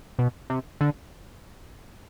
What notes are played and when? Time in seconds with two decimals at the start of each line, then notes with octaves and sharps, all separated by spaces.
0.19 B2
0.50 C3
0.81 D3